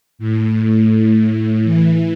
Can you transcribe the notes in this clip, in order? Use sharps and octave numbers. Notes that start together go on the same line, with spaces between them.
A2
E3